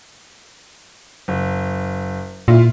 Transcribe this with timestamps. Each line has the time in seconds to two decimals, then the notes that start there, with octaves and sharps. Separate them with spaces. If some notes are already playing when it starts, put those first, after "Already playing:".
1.28 F#1
2.48 A#2 E4 F4